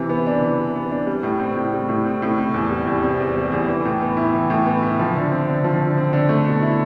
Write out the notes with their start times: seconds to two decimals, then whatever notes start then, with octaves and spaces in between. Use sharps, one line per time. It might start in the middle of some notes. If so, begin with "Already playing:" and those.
Already playing: C3 E3
0.09 B3
0.26 D4
0.41 E3
0.58 C3
0.75 B3
0.91 D4
1.07 G3
1.23 A2
1.40 C4
1.56 A2
1.72 G3
1.89 A2
2.06 C4
2.22 A2
2.38 C3
2.54 E2
2.70 G3
2.87 E2
3.03 C3
3.19 E2
3.35 G3
3.52 E2
3.68 E3
3.85 A2
4.02 B3
4.17 E4
4.33 E3
4.50 A2
4.66 B3
4.83 E4
5.00 F3
5.15 D3
5.32 C4
5.48 D3
5.64 F3
5.81 D3
5.97 C4
6.13 D3
6.29 A3
6.46 B2
6.62 E4